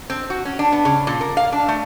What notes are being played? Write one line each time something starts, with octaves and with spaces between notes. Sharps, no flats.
C4
F#4
C#4
D4
B3
C#3
A#2
A#4
F5
D4
A3